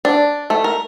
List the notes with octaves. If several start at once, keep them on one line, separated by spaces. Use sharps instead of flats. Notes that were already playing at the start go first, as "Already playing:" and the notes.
D4
A3
A#4